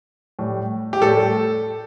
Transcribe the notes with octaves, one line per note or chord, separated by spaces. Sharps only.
A2 G3
G4
A2 G3 A4